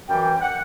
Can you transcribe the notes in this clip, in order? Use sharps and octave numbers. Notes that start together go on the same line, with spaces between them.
F#2 E3 G3 G5
F#5